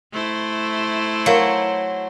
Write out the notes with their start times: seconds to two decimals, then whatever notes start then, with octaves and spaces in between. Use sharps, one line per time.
0.12 A3 E4 C5
1.26 F#3 A#4 F5 C#7